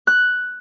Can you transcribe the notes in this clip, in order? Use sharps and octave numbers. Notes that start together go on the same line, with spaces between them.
F#6